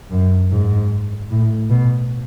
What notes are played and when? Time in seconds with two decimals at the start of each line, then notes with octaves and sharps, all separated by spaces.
0.11 F#2
0.51 G#2
1.30 A2
1.70 B2